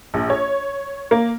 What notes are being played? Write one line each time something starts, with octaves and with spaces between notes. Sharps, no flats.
A#1
C#5
A#3